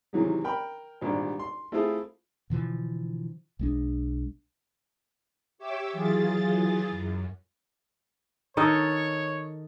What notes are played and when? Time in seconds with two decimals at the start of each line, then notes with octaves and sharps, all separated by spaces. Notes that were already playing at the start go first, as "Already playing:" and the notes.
0.13 C3 D#3 E3 F#3 G#3
0.44 A#4 G5 B5
1.01 G#1 A#2 D3 G3
1.39 C6
1.72 A3 C4 E4 F4 G#4 A4
2.50 B2 D3 E3 F3
3.59 B1 G#3 D4
5.58 G4 C#5 E5 G5 D6 E6
5.92 E3 F#3 F4 G#4 A6
6.91 F#2
8.57 D#3 D#4 A4 C#5